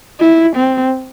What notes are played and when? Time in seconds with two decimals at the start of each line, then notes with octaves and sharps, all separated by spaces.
0.20 E4
0.56 C4